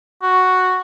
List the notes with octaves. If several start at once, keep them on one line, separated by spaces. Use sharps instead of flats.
F#4